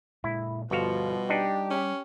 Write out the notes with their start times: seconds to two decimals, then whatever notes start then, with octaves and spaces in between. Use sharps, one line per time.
0.24 A#2 G#3 E4
0.71 G1 B2 F3 G3 F#4 F5
1.30 D4 D#4 G4
1.70 C#4